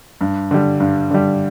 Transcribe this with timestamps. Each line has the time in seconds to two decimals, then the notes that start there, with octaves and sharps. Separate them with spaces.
0.21 G2
0.51 D3 G3
0.80 G2
1.11 D3 G3